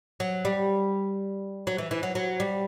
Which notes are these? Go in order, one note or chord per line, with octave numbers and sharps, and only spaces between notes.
F#3
G3
F#3
E3
E3
F#3
F#3
G3